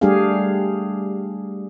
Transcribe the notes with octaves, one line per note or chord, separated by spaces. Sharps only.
G3 A3 D4 G4 G#4 F5